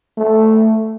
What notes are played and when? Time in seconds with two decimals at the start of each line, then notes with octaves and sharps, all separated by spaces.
0.18 A3